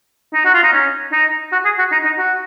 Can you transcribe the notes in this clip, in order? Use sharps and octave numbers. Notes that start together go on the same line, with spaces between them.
D#4
F#4
F4
D#4
C#4
D#4
F#4
G#4
F#4
D#4
D#4
F#4